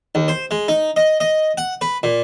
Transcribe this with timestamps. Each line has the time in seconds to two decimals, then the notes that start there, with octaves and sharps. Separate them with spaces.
0.15 D#2
0.28 C5
0.51 G#3
0.68 D#4
0.96 D#5
1.20 D#5
1.58 F#5
1.81 B4
2.03 A#2